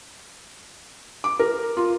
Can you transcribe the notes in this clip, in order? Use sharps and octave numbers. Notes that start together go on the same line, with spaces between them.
D6
A#4
F4